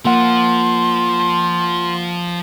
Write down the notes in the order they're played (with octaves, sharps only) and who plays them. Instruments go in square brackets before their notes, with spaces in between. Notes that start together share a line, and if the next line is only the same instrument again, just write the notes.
[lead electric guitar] F3 F4 [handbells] A#3 F#5 [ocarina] C6